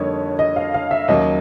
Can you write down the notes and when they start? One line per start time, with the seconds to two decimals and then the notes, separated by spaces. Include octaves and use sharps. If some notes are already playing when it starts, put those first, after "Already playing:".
Already playing: F2 D3 G3 A#3 D#4 C#5
0.39 D#5
0.56 F5
0.74 F5
0.91 E5
1.08 D#2 C#3 F#3 A#3 D#4 D#5